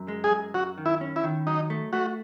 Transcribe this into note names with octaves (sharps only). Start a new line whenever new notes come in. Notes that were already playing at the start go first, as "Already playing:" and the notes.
Already playing: F#2
G#3
G#4
F#2
F#2 F#4
D#3
E4
C#4
E4
D#3
F#3 D#4
A3
A3 F#4